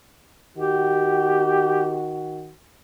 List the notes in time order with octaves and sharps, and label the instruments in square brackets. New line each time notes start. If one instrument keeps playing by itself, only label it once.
[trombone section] D#3 F#4 [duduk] G4